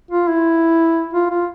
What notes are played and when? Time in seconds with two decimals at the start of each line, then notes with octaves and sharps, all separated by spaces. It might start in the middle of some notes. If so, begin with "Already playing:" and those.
0.11 F4
0.28 E4
1.13 F4
1.30 F4